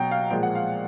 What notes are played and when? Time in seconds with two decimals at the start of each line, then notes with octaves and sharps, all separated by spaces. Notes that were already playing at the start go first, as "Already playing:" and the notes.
Already playing: B2 F#3 G5 A#5
0.11 F5
0.30 A#2 F3 G#3 G5
0.43 F#5
0.55 F5